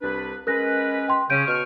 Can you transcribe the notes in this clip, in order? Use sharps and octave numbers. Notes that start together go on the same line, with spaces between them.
C2 D4 B4
G#3 C#4 A#4 B4 F#6 A#6
G5 C6
C#3 C#4 G6 D7 D#7
B2 C#6 F6